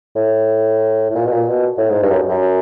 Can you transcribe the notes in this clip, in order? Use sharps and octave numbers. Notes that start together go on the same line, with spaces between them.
A2
A2
A#2
B2
A#2
B2
A2
G#2
G2
F#2
F#2